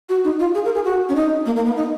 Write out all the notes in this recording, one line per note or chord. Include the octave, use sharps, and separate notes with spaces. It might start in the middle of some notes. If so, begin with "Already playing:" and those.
F#4
D#4
F4
G#4
A#4
G#4
F#4
C#4
D#4
A#3
A#3
B3
D#4